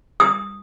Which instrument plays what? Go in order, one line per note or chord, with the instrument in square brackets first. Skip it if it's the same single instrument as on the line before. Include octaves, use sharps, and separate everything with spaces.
[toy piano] D#6